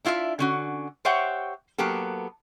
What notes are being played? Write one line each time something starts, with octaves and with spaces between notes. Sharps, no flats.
D4 E4 F4 D5 E5
D3 C#4 F#4
G4 C5 C#5 E5 F#5 G5
F#3 A#3 B3 G4 A4